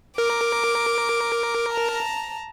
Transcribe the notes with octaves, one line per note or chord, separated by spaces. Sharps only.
A#4 D6
A5 A#5